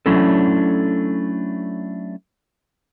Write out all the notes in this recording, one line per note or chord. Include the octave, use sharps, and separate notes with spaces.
F#3 A3 C#4 D4 E4 A4